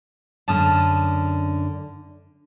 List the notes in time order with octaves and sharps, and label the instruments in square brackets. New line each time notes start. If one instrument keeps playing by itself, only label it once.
[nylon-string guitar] F#2 D3 [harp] A5 D#6 F6